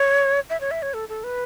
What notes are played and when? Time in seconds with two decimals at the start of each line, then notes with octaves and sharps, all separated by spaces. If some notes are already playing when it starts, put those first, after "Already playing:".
Already playing: C#5
0.50 E5
0.61 C#5
0.71 E5
0.82 C#5
0.94 A4
1.09 A4
1.24 B4